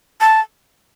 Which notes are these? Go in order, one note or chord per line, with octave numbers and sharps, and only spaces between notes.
A5